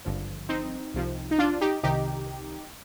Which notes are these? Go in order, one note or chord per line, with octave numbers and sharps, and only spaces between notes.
G#1 G2 D3 F3
C4 D#4
C2 C3 F3
D#4
D4 F4
D#4 G4
C2 C3 D#3 D#4 G4